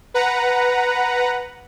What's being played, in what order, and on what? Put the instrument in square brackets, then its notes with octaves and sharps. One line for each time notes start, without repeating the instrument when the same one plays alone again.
[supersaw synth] B4 F#5 A#5